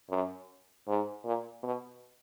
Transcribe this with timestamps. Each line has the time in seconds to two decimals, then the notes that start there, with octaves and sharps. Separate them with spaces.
0.10 F#2
0.88 G#2
1.25 A#2
1.63 B2